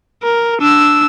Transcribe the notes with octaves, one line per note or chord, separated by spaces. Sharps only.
A#4
D4 E6